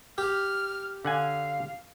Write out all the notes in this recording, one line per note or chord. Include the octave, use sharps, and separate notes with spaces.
G4 F6
D3 F5 F#5 G#5